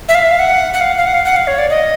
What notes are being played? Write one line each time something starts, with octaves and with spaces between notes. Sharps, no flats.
E5
F5
E5
F5
F#5
F#5
F5
F5
F#5
F5
F#5
F5
C#5
D5
D#5